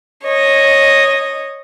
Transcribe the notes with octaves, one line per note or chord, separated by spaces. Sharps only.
C#5 D#5